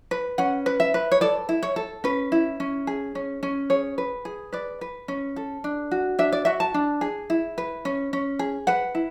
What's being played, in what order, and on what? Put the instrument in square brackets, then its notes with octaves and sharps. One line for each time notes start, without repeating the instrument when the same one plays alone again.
[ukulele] B4
C#4 F#5
B4
E5
B4
C#5
A4 D5
E4
C#5
A4
C#4 B4
E4
C#4
G#4
C#4
C#4
G#4 C#5
B4
G#4
B4 D5
B4
C#4
A4
D4
F#4
D4 E5
D5
F#4 E5
A5
D4
G#4
E4
B4
C#4
C#4
G#4
B4 F#5
E4